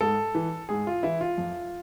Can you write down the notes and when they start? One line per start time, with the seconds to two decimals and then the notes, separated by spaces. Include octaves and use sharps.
0.01 G#2 A4
0.35 E3
0.69 G#2 G#4
0.87 F4
1.03 E3 E4
1.21 F4
1.38 F2